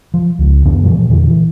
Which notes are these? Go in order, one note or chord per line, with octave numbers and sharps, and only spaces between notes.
F3
C#2
F#2 D#3 B3 D4
A#2 E3 F3 G3
E2 A#2 D3 E3
E3